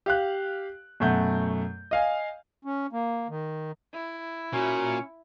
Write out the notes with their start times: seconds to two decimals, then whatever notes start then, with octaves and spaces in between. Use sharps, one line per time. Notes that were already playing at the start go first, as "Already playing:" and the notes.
0.06 G4 F5 F#6
1.00 F#2 B2 A3 F#5 G6
1.91 D#5 F5 G#5
2.65 C#4
2.92 A#3
3.29 D#3
3.94 E4
4.53 A#2 C#4 F#4